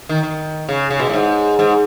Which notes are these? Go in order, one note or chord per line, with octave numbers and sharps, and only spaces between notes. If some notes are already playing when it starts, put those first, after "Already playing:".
D#3
D#3
C#3
C#3
B2
A2
G#2
G#2